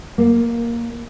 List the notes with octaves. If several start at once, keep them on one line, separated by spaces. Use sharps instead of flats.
A#3